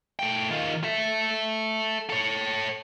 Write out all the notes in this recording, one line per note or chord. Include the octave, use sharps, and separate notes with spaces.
A3 G5
D#3 F4
A4 E5
A4 C#5